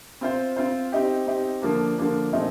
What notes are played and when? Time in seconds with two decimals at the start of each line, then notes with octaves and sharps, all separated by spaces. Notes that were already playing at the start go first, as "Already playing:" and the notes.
0.21 C4 F4 C5
0.57 C4 F4 C5
0.92 C4 D#4 G4
1.27 C4 D#4 G4
1.62 D3 F3 A#3 D4
1.98 D3 F3 A#3 D4
2.33 A#2 F3 A3 C4 D#4